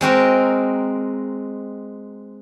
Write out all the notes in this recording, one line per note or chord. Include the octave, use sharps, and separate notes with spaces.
G#3 C4 F#4 A#4